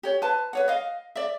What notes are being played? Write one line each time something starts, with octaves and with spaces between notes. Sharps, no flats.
G4 C#5
B4 C5 A5
B4 C#5 F#5
D#5 F5
D5 E5